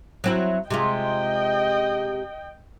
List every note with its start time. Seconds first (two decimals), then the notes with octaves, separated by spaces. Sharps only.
0.24 F#3 C4 E4
0.70 C3 G#3 F4 D#5 G5